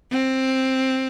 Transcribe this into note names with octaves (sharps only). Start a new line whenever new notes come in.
C4